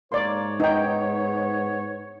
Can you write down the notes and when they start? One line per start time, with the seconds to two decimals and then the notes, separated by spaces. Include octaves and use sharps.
0.12 G#2 A#3 C#5 D5 C6
0.60 B3 D#4 G5